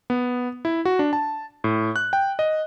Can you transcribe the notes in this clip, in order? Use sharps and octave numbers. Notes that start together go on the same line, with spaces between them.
B3
E4
F#4
D4
A5
A2
F#6
G5
D#5